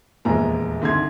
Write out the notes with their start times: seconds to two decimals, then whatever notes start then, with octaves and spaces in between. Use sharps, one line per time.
0.25 D#1 A#1 E2 G#3 A#5
0.82 C2 D3 D#4 C6 G#6